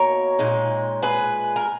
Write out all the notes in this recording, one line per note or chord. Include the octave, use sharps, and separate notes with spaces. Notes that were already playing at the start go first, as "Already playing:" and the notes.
Already playing: B2 A#3 D#4 A#4 C#5
A#2 G#3 D#4
G#4 B4
A#4